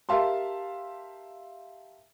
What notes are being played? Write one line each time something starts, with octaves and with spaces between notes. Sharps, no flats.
G4 A#4 E5 F5 A5 C6